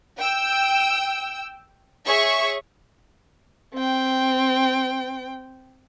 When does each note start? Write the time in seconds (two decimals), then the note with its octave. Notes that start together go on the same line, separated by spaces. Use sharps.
0.19 G5 E6
2.07 G#4 C#5 E5 C#6
3.74 C4 G5